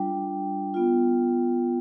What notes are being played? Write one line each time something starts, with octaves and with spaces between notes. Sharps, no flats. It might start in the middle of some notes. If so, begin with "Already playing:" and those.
Already playing: G3 D4 F4 G5
B3 F4